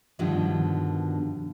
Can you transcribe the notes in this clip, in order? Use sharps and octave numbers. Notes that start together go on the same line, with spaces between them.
G2 B2 D3 D#3 F3 G3